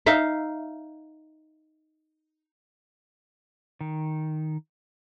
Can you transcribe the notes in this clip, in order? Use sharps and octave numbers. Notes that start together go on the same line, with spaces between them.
D#4 E5 F5
D#3